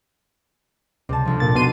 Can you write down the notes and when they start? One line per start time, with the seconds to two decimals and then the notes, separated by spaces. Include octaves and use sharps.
1.09 C#2 C3 G3 A5
1.25 D2 F3
1.40 A#2 A6
1.55 B2 D#4 F#4 C6 D#7